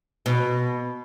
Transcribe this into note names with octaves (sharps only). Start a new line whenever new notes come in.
B2